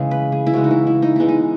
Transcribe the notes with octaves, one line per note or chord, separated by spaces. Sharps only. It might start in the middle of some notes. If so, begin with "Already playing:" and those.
Already playing: C#3 E3 G#3 G#4
B4
G#4
E4
C#3 E3 G#3 F#4
D#4
E4
E4
D#4
E3 G#3 B3 E4
D#4